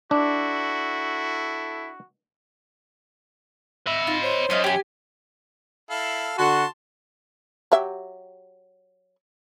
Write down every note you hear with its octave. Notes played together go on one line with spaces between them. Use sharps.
D4 E4 F#4 A4
D#5 E5 B5
D#4 F4
C5 C#5
F#2 D#4 D#5 F5
G4 G#5
E4 A4 F5
D3 F#4 A5 C6
F#3 G4 E5